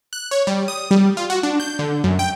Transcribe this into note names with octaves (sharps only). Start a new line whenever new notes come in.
F#6
C#5
G3
D#6
G3
F4
F#4
D4
G6
D3
F#2
G5